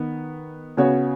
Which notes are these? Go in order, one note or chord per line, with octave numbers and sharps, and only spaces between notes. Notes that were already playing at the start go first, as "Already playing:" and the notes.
Already playing: D#3 B3
C#3 B3 F#4 C#5